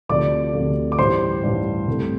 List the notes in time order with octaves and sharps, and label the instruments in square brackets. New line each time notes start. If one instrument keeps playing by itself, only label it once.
[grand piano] D2 C3 F3 A3 D5 D6
D2 C3 F3 A3
D6
A1 G2 G3 C5 C6
A1 G2 G3
C2 C3 A3